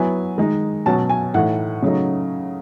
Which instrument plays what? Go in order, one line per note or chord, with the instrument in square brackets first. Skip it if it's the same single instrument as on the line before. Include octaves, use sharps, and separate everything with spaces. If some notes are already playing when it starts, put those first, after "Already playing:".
Already playing: [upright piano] F#3 B3 E4 G#5
D#3 G#3 D#4
B2 F#3 C#4 A5
G#5
A2 E3 A3 D#4 F#5
C#3 F#3 A3 D#4